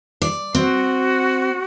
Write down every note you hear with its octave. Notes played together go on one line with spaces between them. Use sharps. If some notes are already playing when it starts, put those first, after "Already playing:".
D5
C4 F#4